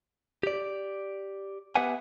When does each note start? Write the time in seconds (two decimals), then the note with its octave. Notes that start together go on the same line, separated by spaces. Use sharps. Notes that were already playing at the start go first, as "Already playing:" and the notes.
0.43 G4 D5
1.75 B3 G4 B4 E5 F#5 G#5